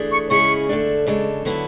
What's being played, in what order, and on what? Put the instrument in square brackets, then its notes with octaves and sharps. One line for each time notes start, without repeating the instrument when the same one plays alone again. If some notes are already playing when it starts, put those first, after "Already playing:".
Already playing: [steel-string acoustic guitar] E3 A3 D4 G#4
[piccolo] C#6
[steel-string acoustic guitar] C#3 G#3 C#4 E4 G#4 [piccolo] C#6
[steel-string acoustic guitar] D3 A3 D4
C#3 G#3 D4 A4
D3 F#3 B3 E4